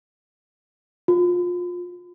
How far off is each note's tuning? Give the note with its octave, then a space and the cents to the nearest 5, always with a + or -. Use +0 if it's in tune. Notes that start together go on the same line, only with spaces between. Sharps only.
F4 +25